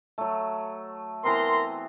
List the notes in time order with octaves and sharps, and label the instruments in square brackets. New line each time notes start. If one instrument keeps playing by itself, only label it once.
[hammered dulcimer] F#3 A3
[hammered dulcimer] E3 B3 C4 [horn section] A#4 A#5 C6